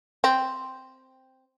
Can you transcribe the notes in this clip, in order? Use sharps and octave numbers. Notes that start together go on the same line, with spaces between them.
C4